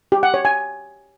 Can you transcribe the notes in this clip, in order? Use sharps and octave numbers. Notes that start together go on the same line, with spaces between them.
G4
F#5
C#5
G#5